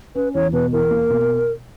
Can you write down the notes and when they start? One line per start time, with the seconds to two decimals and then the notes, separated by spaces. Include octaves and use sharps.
0.15 C#4 B4
0.34 E2 C#5
0.53 B2 B4
0.72 E2 A#4
0.91 A#3
1.10 B2